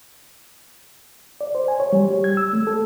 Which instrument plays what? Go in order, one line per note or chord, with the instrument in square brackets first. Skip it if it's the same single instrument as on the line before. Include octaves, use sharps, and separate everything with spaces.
[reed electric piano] D5
C5
G#5
C#5
G3
G4
G#6
E6
A3
A4